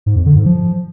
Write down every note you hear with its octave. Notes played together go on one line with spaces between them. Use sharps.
G#2
F2
D3
G#2
F3